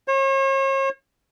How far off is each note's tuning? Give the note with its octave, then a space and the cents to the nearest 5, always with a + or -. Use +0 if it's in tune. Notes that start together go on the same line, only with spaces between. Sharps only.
C#5 -40